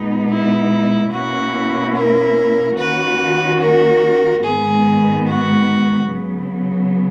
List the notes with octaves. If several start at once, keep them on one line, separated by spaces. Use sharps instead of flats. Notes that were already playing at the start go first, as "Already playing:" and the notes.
Already playing: A#2 G#3 B3 D#4
E4
B2 A#3 C#4 E4 F#4
A#4
D#3 A#3 C#4 F#4 B4
A#4
G#2 D#3 G#3 B3 G#4
F#4
C#3 F#3 B3